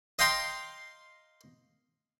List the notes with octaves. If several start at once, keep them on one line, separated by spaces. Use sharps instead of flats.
D#5 F5 G5 A#5 C6